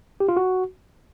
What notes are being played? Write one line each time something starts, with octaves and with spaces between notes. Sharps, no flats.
G4
F4
F#4